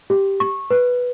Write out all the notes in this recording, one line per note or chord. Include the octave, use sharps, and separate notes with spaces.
G4
C#6
B4